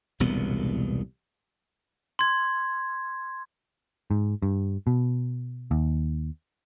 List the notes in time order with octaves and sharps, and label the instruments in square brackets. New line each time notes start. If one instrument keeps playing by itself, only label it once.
[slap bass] E1 C2 A#2 B3
[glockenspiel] C6 G#6
[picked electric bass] G#2
G2
B2
D#2